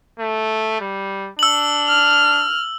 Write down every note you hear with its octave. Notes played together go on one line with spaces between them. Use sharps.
A3
G3
D4 E6 F#7
F6